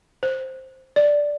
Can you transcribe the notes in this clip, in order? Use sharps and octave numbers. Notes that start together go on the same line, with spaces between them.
C5
D5